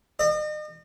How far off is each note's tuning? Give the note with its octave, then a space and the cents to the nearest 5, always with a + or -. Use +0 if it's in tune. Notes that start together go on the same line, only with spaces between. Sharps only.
D#5 -40